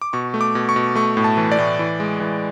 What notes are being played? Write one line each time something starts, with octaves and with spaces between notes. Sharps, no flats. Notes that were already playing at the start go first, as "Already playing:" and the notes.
D6
B2 C#6
A3
D6
B2
C#6
B2
A3 C#6
A2
A5
E3
D5
A2
E3
G#3
E3